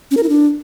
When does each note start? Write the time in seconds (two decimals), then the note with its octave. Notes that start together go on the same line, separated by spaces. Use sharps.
0.11 C#4
0.17 A#4
0.23 E4
0.29 D4